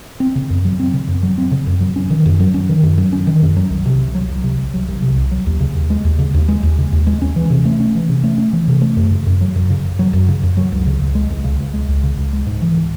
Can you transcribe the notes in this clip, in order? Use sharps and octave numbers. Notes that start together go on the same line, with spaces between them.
C4
C#3
F#2
F#3
C4
C#3
F#2
F#3
C4
C#3
F#2
F#3
C#4
D#3
F#2
F#3
C#4
D#3
F#2
F#3
C#4
D#3
F#2
F#3
C2
C3
C2
F#3
C2
C3
C2
F#3
C2
C3
C2
F#3
D#2
C#3
D#2
G#3
D#2
C#3
D#2
G#3
D#2
C#3
D#2
G#3
C#4
E3
C3
A3
C#4
E3
C3
A3
C#4
E3
C3
A3
F#2
C#3
F#2
F#3
F#2
C#3
F#2
F#3
F#2
C#3
F#2
F#3
C#2
C#3
C#2
G#3
C#2
C#3
C#2
G#3
C#2
C#3
C#2
G#3
G#2
E3